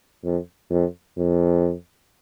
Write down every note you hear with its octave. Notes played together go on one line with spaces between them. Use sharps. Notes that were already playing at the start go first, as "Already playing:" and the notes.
F2
F2
F2